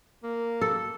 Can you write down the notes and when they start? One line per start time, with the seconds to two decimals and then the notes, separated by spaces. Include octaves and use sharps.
0.24 A#3
0.61 A4